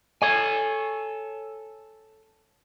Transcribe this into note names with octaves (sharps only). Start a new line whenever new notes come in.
A4 C#5 G#5